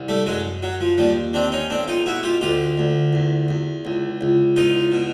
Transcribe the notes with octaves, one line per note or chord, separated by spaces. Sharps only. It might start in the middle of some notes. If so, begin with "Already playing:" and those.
Already playing: C2
G3 A3
F#2 F#3 G#3
F#2 F#3
F3
D#2 F3 G3
D#3 C4 D4
C#4 D#4
B1 C4 D4
D#4 F4
B2 E4 F#4
F4 G4
D2 F4 G4
D2
E2
E2
C#2
C#2
E2 D#4 F4
B2